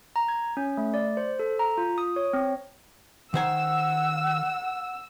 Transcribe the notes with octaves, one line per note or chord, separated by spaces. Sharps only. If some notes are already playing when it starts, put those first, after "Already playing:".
A#5
G#6
C#4
A3
D5
C5
A4
A#5
F4
D#6
C#5
C4
D#3 C5 F#5 G#5 E6